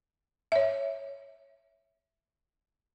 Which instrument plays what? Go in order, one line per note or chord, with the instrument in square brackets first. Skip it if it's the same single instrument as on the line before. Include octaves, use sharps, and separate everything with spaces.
[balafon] C#5 E5